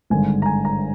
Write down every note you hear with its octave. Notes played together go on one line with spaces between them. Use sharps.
G#1 G2 D3 G#3 G#5
A#5
G#5
A#5